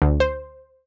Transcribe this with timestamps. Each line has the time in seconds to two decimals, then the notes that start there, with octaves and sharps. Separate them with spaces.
0.02 D2
0.20 C5